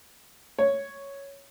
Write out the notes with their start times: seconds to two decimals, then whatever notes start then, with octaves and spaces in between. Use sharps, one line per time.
0.58 C#5